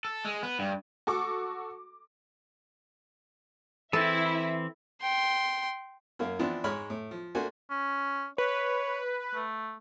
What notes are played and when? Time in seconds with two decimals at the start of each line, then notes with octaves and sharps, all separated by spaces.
0.05 A4
0.25 G#3
0.43 B3
0.59 G2
1.07 F#4 A4 C#6 D6
3.93 E3 C4 E4 A4 E5
5.02 G5 C6
6.19 F#2 A#3 F5
6.39 E3 F3 B3 C4 D4
6.64 G#2 G#3 C#5 B5 F6
6.90 A2
7.11 F3
7.35 A3 A#3 D4 F#4 C5 G#5
7.70 C#4
8.38 B4 C#5
9.34 A3